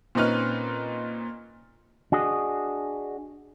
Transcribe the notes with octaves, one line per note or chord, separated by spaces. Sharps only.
A#2 C4 C#4 D#4 B4 F6
D4 F#4 G#4 D#5